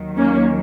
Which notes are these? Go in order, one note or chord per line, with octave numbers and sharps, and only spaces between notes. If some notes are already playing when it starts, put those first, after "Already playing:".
Already playing: D#2 D#3 F#3
A#3 C#4